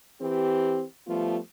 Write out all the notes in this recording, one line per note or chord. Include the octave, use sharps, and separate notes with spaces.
E3 C4 G4
F3 G3 A3 B3 F4